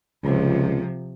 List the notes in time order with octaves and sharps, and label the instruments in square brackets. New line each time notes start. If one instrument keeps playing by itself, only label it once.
[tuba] C#2 [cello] C3 F3